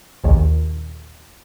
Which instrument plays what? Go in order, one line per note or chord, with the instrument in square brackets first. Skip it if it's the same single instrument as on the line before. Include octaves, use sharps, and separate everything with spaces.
[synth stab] A#1 D#2